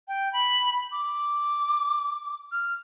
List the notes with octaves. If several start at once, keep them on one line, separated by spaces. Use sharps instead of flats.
G5
B5
D6
F6